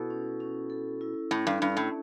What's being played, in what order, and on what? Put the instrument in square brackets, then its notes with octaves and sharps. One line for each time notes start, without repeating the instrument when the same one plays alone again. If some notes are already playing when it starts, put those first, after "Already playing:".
Already playing: [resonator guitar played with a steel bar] B2 [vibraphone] E4 A4
[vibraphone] C#4
C#4
A4
E4
[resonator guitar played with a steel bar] A2 [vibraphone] C#4
[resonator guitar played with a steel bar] G2
[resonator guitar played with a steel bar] G2 [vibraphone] C#4
[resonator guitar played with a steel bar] A2